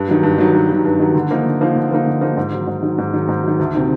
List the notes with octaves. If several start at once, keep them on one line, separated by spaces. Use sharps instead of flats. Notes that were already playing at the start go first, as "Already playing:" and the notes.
Already playing: G2
D#3 F#3
G2
D#3 F#3
G2
D#3 F#3
G2
D#3 F#3
D3
F3 A#3 D#4
D3
F3 A#3 D#4
D3
F3 A#3 D#4
D3
F3 A#3 D#4
G#2
D#3 F#3
G#2
D#3 F#3
G#2
D#3 F#3
G#2
D#3 F#3
D2
C3 D#3